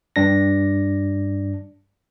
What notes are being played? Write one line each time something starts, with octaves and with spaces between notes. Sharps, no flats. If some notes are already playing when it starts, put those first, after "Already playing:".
G2 D4 A#6